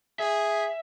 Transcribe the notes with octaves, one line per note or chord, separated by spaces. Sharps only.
G#4 E5